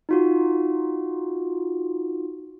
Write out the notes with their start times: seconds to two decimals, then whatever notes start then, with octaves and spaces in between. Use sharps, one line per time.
0.09 D#4 F4 F#4